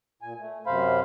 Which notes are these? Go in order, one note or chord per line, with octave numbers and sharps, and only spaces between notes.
A#2 G#5
A3
F#2 C3 C5 F5 B5